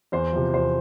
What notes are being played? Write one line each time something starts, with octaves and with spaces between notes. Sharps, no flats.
E2 C5
C3 F3
E2 C5